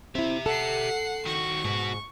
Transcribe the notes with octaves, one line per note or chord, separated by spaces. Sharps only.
C4 E4 G4 E5
A4 F#5 C7
D#3 F#4 C#6
G#2 B2 F#4